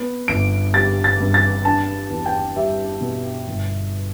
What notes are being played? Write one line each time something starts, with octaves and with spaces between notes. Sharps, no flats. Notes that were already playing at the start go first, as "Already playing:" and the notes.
Already playing: B3
G1 D7
G3 A6
A6
G2
A6
D4 A5
E2
G5
G3 E5
B2
G1